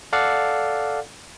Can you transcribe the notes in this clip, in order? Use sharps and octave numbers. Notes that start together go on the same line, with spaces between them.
A4 D5 F5 F#5